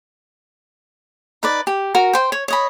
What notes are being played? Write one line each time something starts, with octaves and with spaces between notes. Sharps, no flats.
D#4 B4 D5
G4
F#4 A#4 A#5
C5 G5
C#5
C#5 D#5 B5